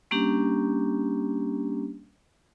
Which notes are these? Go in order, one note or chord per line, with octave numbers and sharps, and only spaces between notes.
G3 A#3 C#4 D4 G4